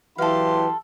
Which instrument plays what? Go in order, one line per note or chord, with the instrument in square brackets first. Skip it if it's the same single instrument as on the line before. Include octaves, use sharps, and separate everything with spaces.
[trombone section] E3 F#3 E4 [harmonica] G4 C6 [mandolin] A4 F5 [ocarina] B4